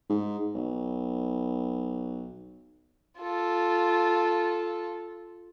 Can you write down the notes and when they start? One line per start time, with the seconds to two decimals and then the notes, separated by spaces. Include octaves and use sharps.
0.09 G#2
0.55 B1
3.19 F4 A4